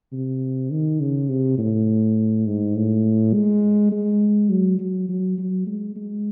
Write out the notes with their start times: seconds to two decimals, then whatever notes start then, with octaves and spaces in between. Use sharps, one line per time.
0.13 C3
0.71 D#3
1.01 C#3
1.29 C3
1.58 A2
2.46 G#2
2.76 A2
3.34 G#3
3.92 G#3
4.50 F#3
4.79 F#3
5.09 F#3
5.38 F#3
5.66 G#3
5.96 G#3